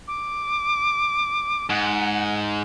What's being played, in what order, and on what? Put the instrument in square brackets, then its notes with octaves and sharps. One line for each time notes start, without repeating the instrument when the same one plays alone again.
[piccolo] D6
[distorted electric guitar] G#2 [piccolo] F#5